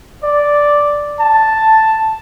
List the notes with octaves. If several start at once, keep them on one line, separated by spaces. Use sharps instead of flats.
D5
A5